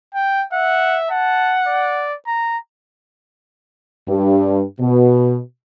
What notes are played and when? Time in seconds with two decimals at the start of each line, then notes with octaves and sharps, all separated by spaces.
0.14 G5
0.53 E5 F#5
1.10 F#5 A5
1.67 D5
2.27 A#5
4.08 G2
4.80 B2